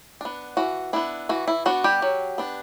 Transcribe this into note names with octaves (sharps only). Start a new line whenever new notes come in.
B3 D4
E3 F#4
B3 D4 E4
E3 F#4
E4
B3 D4 F#4
G3 G4
F#3
B3 D4